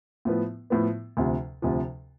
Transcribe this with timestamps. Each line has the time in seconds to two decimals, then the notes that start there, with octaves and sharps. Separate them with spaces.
0.25 A2 F3 B3
0.70 A2 F3 B3
1.17 D2 C3 F3
1.62 D2 C3 F3